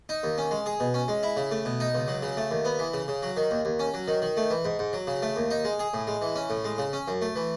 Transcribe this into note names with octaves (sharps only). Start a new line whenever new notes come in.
D#4
D#2
C#4
G#3
G#4
B2
C#4
G#3
E4
C#3
A3
B2
D#4
C#2
F#3
C#3
A3
D#2
B3
E3
C#3
C#3
F#3
D#3
D#2
D#2
C#4
F#3
D#3
D#3
A3
E3
G#2
G#2
F#3
C#3
A3
D#2
D#4
G#3
G#4
A2
G#3
E3
C#4
A2
G#3
C#3
C#4
F#2
A3
E3